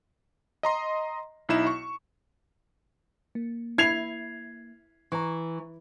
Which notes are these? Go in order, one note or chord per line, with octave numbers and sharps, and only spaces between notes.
D#5 A#5 C6
B1 D#4 E4 E7
C#6
A#3
E4 G#6 C7 F7
E3 A#5 C#6